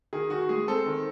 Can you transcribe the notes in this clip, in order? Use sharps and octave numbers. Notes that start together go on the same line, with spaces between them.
D#3 G#4
D#3 F#4
G#3 G#4
C4 A4
D#3